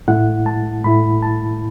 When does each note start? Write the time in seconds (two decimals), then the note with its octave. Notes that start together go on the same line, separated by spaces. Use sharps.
0.08 A2 A3 E4 F#5
0.46 A5
0.84 A2 A3 E4 B5
1.22 A5